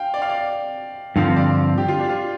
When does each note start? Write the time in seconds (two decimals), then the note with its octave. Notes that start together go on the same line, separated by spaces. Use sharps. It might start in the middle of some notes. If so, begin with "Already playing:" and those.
Already playing: F5 G5
0.14 D5
0.22 F5
0.29 D5
1.16 G2 D3 F3 C4 F5
1.36 D5
1.78 G4
1.88 F4
1.99 D4
2.09 F4